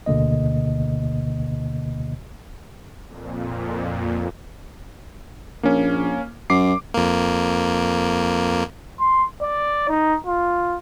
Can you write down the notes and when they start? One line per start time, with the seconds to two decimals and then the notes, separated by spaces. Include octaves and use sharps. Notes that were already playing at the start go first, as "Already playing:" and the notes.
0.06 D2 B2 D3 A#3 D#5
3.06 F2 A#2
5.63 A#1 A#3 C#4
6.50 F#2 D6 C7
6.94 F2 A#3
9.00 C6
9.42 D5
9.89 D#4
10.27 F4